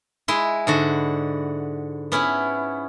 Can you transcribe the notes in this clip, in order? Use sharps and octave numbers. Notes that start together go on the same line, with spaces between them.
G#3 E4 C6
G#2 D3 F#4
B3 C#4 E4